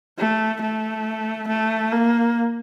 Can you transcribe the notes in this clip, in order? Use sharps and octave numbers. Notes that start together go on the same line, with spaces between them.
A3
A3
A3
A#3